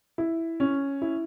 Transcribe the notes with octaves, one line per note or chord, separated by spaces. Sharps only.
E4
C#4
E4